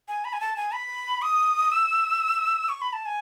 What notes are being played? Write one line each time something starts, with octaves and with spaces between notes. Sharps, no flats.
G#5
B5
G#5
A5
G#5
B5
D#6
E6
C#6
B5
A5
G#5